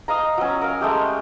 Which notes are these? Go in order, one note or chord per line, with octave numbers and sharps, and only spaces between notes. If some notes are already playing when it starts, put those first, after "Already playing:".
D#5 F5 A#5
F#3 C#4
A#4 F5
G#3 A3 G4